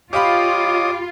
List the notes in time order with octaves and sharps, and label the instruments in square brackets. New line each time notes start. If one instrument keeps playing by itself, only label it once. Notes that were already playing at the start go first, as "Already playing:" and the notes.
[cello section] F4 [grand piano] G4 F5 B5 [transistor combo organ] C#5 D#5 D#6 [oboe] D6